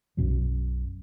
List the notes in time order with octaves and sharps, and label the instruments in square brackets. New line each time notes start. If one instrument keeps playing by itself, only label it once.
[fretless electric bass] B1 F#2 B2 F#3